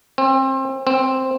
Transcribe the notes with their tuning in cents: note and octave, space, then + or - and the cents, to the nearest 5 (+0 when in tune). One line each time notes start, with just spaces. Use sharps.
C4 +30
C4 +5